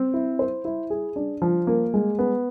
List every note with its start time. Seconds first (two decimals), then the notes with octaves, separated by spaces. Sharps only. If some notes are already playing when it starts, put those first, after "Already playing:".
Already playing: C4
0.14 E4
0.39 C5
0.65 E4
0.90 G#4
1.16 D4
1.42 F3
1.67 A#3
1.94 G#3
2.19 B3